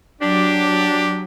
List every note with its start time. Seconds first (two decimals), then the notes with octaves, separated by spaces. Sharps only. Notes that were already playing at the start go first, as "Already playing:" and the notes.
0.22 F#3 D4 G4